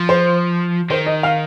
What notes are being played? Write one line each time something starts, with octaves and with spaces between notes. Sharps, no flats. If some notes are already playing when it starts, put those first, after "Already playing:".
Already playing: F3
C5
D#3 C5
D#5
F5